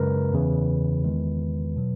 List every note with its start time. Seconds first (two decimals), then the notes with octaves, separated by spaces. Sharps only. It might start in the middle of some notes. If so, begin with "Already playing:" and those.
Already playing: F#2 C#3 G#3 A#4 B4
0.33 E2 C#3 E3
1.04 E2 D#3 G#3
1.76 B2 F#3